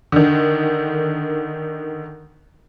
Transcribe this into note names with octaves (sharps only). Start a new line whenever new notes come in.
D3 D#3